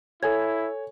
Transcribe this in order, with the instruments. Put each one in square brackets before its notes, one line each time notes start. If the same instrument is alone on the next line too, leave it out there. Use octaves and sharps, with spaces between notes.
[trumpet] E4 [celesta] A4 G#5 G#6 [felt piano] C#5